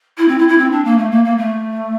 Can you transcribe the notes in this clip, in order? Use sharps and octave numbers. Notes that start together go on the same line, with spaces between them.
E4
C4
E4
E4
C4
D4
A#3
A3
A#3
A#3
A3